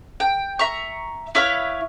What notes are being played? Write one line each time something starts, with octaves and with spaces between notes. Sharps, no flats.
G5
E5 A#5 C#6
E4 B4 C#5 F5